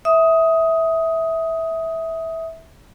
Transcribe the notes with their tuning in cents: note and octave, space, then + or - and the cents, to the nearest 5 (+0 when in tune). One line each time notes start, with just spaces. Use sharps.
E5 -15 D#6 +10